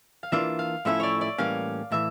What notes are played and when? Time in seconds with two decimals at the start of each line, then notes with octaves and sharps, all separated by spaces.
0.23 F5
0.32 E3 A#3 D4 F4 E5
0.59 F5
0.85 A2 F3 A3 C#4 E4 E5
1.00 C#5 D5
1.21 D5
1.38 A2 E3 G3 A#3 C#4 F5
1.92 A2 E3 E5